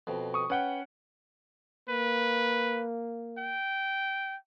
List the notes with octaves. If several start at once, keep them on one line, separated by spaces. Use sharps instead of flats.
F2 B2
C#6 D#6
C#4 B4 F#5 G5
A#3 B4
G5